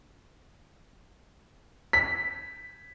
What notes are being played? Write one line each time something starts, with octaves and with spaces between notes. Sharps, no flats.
B6